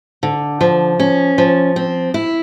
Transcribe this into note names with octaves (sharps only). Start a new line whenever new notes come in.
D3
F3
C#4
F3
C4
E4